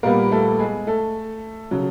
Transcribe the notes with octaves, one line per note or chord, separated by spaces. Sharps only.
A#2 G3 A#3 B3 A#4
A3 A4
G#3 G#4
A3 A4
C#3 F#3